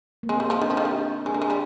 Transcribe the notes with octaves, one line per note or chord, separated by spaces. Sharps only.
A#3
G#3 C4
G3
F3
D#3 D4
F3
D#3
G3
G#3 D4
A#3
G#3
G3